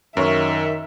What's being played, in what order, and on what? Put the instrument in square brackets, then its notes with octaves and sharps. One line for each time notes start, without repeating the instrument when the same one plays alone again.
[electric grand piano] F#2 [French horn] D#3 [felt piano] A#4 C#5 C#6 [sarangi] E5